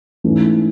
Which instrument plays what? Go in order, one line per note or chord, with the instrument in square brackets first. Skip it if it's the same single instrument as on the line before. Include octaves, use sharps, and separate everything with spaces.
[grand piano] G#2 E3 A3 C#4